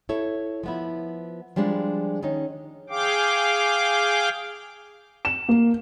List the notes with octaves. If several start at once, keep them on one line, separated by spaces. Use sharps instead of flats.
E4 A4 C#5
F3 B3 E4
F3 G3 G#3 D4
D#3 C#4 D#4
G#4 F5 G5 D6
E7
A#3